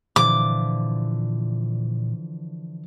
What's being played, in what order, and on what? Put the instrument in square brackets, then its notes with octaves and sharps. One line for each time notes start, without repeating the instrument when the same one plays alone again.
[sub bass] A#2 [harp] D3 E3 F3 [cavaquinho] D6